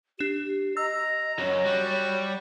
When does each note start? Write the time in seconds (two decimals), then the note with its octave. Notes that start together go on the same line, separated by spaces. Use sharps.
0.19 D4 G4 E7
0.77 D#5 A#5 E6
1.39 F#2 F#3 C#5
1.65 G3 F#4